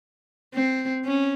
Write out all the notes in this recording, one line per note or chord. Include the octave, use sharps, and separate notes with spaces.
C4
C#4